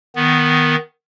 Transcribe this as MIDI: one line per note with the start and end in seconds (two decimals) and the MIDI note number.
0.16 0.76 51
0.16 0.76 59